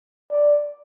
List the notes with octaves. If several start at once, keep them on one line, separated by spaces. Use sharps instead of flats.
D5